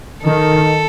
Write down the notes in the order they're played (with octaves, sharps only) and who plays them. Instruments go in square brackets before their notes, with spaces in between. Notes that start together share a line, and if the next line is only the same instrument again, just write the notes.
[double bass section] D#3 [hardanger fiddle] A4